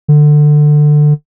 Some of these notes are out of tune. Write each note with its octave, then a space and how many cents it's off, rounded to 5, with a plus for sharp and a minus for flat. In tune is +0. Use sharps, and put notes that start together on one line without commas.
D3 +20